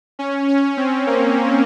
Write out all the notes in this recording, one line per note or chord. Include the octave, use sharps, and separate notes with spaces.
C#4
C#4
C4
A#3